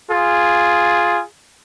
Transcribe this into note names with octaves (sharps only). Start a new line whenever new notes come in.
F4 G#4